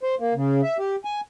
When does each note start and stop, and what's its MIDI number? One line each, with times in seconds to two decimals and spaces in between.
0.03 0.15 72
0.20 0.34 58
0.34 0.61 49
0.63 0.77 76
0.78 0.96 67
1.05 1.21 80